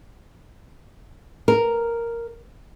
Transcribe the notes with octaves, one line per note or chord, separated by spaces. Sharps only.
A#4